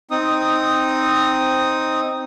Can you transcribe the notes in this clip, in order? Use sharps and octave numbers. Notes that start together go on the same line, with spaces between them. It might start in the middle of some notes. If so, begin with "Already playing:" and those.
C4 D#4 D#6